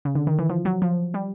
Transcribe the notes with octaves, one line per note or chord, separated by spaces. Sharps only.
C#3
D3
D#3
E3
F3
F#3
F3
G3